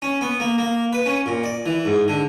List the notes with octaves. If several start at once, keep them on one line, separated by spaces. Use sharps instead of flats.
C#4
B3
A#3
A#3
B4
C#4
A#2
D5
E3
G#2
D3